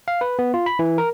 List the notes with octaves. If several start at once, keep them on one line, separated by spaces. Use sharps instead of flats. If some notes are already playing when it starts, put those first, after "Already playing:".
F5
B4
B3
F4
B5
E3
A#4